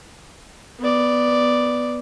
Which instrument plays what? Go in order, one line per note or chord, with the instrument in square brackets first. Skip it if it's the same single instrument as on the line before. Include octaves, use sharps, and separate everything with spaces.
[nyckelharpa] B3 D5